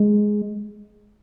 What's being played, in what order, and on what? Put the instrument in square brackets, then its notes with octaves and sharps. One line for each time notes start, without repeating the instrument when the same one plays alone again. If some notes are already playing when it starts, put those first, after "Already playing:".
Already playing: [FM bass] G#3